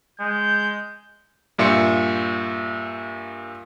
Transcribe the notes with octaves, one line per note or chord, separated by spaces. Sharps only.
G#3 G6
G2 A#2 E5 C6 C#7